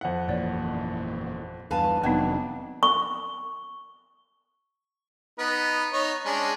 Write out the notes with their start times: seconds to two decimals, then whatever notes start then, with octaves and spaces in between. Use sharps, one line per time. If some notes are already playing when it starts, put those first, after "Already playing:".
0.01 F2 F#5
0.28 G1 A#2 E3 C#5 D5
1.71 E2 G2 B4 F5 G#5 A5
2.03 F1 G#2 D#3 F#3 B3 C4 D4 D#4
2.83 C#6
5.39 B3 D#4 B4
5.93 D#4 C#5
6.25 G#3 C#4 D4